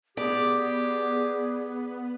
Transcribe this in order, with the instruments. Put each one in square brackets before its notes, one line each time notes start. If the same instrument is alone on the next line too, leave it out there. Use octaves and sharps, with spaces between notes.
[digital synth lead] B3 [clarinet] G4 [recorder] G#4 [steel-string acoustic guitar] D5